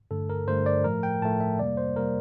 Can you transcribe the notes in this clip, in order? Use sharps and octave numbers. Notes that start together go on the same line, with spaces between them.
G2 D3 A3 A4
A#4
G2 D3 A3 C5
D5
A2 F3 A3 A#4
G5
A2 F3 A3 A5
E5
F2 C3 G3 A#3 D5
C5
C3 G3 A#3 A#4